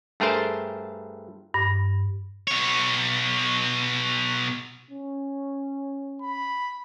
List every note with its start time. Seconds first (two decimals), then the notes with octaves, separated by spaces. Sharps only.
0.20 G2 A3 G#4 A#4 C5 A5
1.54 G2
2.47 B2 C#5
4.91 C#4
6.22 B5